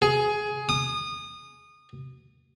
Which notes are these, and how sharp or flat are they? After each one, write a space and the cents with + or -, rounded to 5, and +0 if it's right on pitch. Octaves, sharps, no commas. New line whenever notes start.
G#4 +15
D#6 -25